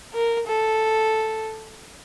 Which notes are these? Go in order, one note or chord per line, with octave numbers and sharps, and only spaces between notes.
A#4
A4